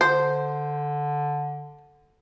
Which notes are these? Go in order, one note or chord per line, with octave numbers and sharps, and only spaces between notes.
D3 C5